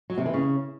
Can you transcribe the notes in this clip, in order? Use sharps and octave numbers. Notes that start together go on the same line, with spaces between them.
F#3
C3
E3
C#3